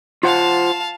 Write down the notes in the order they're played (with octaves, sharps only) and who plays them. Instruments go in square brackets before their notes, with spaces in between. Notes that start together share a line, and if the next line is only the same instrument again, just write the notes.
[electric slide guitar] F4 C5 F#5 [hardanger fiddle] F5 A5